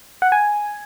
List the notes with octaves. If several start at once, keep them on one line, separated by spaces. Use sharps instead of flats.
F#5
G#5